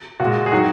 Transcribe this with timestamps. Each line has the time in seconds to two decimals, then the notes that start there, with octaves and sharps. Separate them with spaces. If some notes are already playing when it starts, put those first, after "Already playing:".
0.20 A#2 G#3 F#4
0.46 G#4
0.52 D#3 F#3 F#4